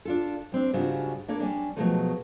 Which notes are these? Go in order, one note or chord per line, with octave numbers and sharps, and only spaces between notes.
D4 F4 A4
G3 C4 D4
G#2 C#3 G3 D4 F4 F#4
A#3 D4 A4 C#5 D5
G3 C#4 D4
B2 D3 F3 F#3 G#3 A3